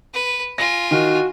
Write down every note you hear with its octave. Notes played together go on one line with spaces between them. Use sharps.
B4
F4 G#5 A#6
D#3 F#4